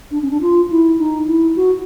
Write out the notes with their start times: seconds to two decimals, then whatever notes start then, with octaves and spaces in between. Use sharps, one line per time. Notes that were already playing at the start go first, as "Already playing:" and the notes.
0.11 D4
0.22 C#4
0.31 D4
0.41 F4
0.70 E4
0.98 D#4
1.27 E4
1.56 F#4